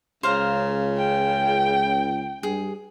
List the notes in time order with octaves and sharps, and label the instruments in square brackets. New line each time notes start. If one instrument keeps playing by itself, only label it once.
[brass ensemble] C#2 [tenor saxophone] C#3 [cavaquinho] C5 F5 A#5
[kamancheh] G5
[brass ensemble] G2 [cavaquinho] G#4